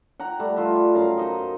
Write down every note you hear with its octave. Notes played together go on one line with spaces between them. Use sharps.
F#5 G5 A#5
G3 A3
F4 D#5 E5
G3
F#2 F5 A#5
D#4 C5 D#5